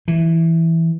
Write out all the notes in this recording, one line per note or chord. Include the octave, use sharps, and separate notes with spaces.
E3